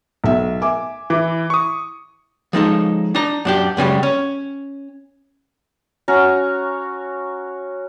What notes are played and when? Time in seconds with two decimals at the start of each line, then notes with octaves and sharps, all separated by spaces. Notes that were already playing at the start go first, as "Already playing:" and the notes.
0.24 B1 E5
0.62 E5 G#5 D6
1.10 E3 E4 D6
1.50 C#6 D#6
2.53 F3 G#3 D#4 A4
3.15 D4 A#5
3.45 F#2 D4 G4
3.77 F#2 C#3 G3 G#3
4.03 C#4
6.08 C#4 F#4 A#5